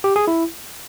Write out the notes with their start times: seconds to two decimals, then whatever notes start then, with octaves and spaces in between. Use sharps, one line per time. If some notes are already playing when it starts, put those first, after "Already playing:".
0.04 G4
0.16 G#4
0.28 E4